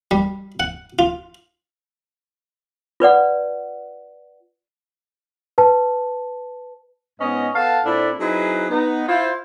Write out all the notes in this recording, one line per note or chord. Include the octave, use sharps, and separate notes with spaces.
G3
F#5
F4
F4 B4 D5 F#5
B4 A5
G#2 B3 C#4 D#5
B3 A4 F5 F#5 A5
A#2 C4 D4 E4 A4 B5
F#3 C4 D#4 E4 G#4 B4
B3 D#4
E4 F4 C5